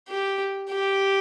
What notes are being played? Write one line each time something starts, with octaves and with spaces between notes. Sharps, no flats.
G4
G4